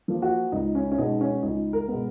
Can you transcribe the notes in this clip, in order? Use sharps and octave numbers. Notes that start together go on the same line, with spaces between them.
F3 A#3
F#4
C#2 D#4
C#4
C#4
B2 G#3 B3 D#4
C#4
C#2 D#4
A#4
B2 G#3 B3